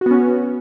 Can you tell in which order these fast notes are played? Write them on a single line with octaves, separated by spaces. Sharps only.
F#4 B3 C#4